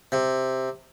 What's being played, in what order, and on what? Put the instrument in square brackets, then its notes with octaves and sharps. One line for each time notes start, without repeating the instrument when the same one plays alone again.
[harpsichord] C3